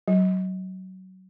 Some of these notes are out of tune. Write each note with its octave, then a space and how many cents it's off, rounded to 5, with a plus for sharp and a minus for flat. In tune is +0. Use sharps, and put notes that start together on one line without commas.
F#3 +20